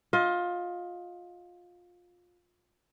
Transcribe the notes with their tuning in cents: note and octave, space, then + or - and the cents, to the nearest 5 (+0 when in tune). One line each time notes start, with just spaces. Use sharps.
F4 +20 D#5 +30